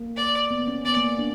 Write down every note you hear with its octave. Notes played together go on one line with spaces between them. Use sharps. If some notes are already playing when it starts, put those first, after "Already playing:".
Already playing: A#3
D5
B3
C#4
B3 D5
A#3
D4